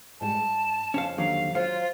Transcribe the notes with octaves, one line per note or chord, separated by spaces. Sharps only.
G#2 G3 F#4 A5
G2
F2 C#3 C#4 F5
D#2 D3 F#3 F5
F#3 F4 C5 F5